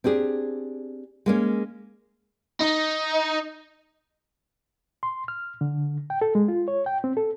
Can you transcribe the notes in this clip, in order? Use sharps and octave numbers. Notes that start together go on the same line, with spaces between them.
C4 D4 G4 G#4
G#3 A#3 C#4
D#4
C6
F6
D3
G5
A4
G#3
F4
C#5
G5
C4
A4